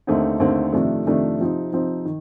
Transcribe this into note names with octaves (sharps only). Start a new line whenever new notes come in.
D#2 D3 A3 C4 D#4
D#2 D3 A3 C4 D#4
F2 C3 D#3 A3 D4
F2 C3 D#3 A3 D4
C3 F3 C4 D#4
C3 F3 C4 D#4
D#3